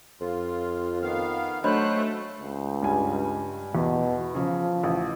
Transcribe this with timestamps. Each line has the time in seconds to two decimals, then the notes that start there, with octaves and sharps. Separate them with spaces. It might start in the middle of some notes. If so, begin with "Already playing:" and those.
0.21 F2 F4
1.02 D#3 B3 F5
1.64 F#3 A3 D4 C5 D#5 B5 F#6
2.41 C#2
2.82 G2 G3 G#5
3.75 E2 B2
4.35 C#3 F3
4.84 A1